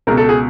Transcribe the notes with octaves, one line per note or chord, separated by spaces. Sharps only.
C#2 B2 A#4
A4
G#4